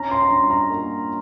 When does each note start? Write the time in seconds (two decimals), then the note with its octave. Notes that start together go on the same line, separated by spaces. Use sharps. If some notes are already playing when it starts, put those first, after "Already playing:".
Already playing: C#4 A#5
0.11 C6
0.22 A#5
0.30 G2 C6
0.51 A#5
0.70 A#3